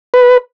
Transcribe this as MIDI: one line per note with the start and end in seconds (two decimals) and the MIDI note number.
0.14 0.38 71